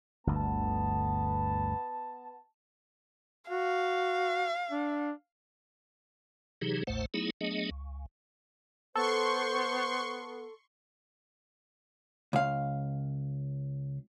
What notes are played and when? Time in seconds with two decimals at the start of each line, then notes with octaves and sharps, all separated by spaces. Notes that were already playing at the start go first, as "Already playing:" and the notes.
0.27 G1 D2 B3 A5
3.50 F#4 F5
4.71 D4
6.61 C3 E3 F#3 D#4 G4 G#4
6.87 A1 D#2 A2 A3 C5 F#5
7.14 F#3 A3 B3 D#4 E4 G#4
7.41 F#3 A3 B3 D4 G#4 D#5
7.71 C#2
8.95 B3 A4 C5 C6 C#6
12.33 C#2 F5